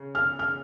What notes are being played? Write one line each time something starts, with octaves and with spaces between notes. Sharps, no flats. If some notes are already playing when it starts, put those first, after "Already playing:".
Already playing: C#3
F6
F6